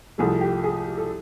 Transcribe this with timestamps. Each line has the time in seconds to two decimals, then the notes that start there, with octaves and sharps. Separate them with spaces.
0.18 C2 C3 F3 A3 G#4
0.41 G4
0.64 G#4
0.98 A4